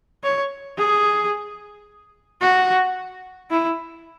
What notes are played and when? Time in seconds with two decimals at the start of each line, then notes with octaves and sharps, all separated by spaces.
0.24 C#5
0.78 G#4
2.41 F#4
3.50 E4